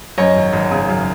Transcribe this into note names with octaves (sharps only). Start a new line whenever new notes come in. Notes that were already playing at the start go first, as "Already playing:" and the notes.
F#2 C#5 D#5
G#1
G#1
C#3
F#2